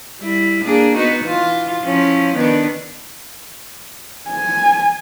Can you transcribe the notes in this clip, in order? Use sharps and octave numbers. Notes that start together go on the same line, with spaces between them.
G3 E4
A#3 D4 G#4
B3 D#4 F#4
E3 F4
F3 C#4 E4
D#3 B3 D4
G#5